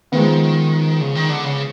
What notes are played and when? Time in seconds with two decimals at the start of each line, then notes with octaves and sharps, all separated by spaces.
0.12 D#3 F3 G#3 B3
1.01 C#3
1.15 D#3
1.29 D3
1.44 C#3